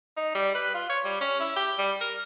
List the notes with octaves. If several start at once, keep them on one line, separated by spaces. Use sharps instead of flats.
D#4
G3
B4
F4
C#5
G3
C#4
E4
G4
G3
A#4